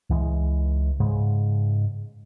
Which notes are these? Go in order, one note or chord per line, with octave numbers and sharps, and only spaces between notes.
C#2 E3 G#3
G#2 C#3 G#3